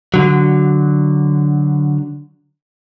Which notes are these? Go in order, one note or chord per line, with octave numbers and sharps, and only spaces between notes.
D3 F#3